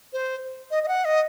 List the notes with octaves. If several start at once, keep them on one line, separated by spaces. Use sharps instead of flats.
C5
D#5
D#5
F#5
D#5